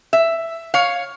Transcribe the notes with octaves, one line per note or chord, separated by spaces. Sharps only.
E5
C#5 F5